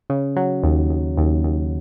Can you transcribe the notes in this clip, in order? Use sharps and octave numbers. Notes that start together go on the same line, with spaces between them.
C#3
F#3
D#2
D#2
D#2
D#2